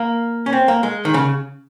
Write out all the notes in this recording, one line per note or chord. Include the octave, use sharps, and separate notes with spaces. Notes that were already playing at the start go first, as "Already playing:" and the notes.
Already playing: A#3
C#4
C4
A#3
G#3
D#3
C#3